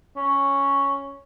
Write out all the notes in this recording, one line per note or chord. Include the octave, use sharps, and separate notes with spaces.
C#4